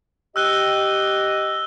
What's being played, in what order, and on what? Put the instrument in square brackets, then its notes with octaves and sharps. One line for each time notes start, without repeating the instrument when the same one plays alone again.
[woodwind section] G4 D#5 [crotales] E6 F#6 G7